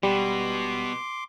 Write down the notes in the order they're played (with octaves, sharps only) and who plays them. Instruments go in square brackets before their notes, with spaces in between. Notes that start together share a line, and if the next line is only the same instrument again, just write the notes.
[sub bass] E1 [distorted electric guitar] B2 B3 [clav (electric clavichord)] G3 [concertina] C6 D6